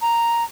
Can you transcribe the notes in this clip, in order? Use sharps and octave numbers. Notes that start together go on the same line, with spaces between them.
A#5